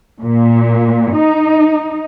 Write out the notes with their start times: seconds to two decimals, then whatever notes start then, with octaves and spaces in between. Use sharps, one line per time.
0.23 A#2
1.15 D#4